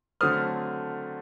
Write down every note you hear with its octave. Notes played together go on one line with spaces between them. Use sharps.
D3 F#3 A3 C4 D#6 F6